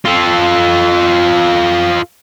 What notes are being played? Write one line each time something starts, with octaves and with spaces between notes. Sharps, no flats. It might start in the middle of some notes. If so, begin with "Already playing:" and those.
F4 A4